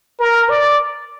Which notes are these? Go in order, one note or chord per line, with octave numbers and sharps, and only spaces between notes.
A#4
D5